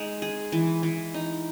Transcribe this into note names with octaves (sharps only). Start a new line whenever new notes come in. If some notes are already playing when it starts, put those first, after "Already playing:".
Already playing: G#3 D#4
G#4
E3
E3
D#4